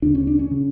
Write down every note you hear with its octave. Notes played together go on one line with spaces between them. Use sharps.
D2 C#3 D4
C#4
D4
C#4
C#3